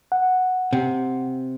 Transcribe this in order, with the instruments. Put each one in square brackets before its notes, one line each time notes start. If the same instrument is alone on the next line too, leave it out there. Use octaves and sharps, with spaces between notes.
[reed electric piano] F#5
[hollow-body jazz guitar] C3